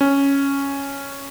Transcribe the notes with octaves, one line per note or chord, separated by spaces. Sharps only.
C#4